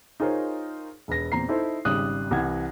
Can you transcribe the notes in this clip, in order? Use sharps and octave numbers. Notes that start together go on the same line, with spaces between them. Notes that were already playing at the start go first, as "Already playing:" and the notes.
D#4 F4 G#4 A#4 C5 C#5
E1 B4 A#6
E2 A#2 C4 A#5 C7
D#4 E4 A4 C5
G#1 C#3 G3 D#6 F#6
C2 E3 F#5 G#6